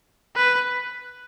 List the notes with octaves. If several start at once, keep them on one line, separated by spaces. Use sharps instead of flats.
B4